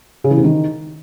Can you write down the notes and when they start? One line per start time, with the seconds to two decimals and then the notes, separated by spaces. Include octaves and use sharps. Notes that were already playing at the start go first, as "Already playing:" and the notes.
0.24 C#3
0.31 E3
0.37 C3
0.44 D#3